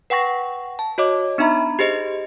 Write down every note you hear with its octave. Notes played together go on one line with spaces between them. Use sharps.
B4 F#5 G5 C#6 A#6
A5
F#4 C#5 D#5 D6
B3 D4 D#4 E5 A#5 B5
G4 G#4 C5 D#5